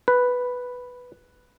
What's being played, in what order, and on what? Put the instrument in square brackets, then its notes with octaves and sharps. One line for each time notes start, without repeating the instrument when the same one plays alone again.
[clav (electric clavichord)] B4